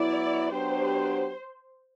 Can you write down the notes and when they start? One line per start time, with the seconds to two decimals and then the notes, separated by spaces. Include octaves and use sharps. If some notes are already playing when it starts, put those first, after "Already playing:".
Already playing: F#3 B3 E4 D5
0.51 F#3 B3 D4 G4 C5